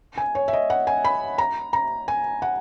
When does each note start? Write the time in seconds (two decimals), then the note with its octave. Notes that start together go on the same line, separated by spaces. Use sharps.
0.18 G#5
0.35 C#5
0.48 E5
0.53 D#5
0.70 F#5
0.87 G#5
1.05 B5
1.38 A#5
1.73 A#5
2.08 G#5
2.42 F#5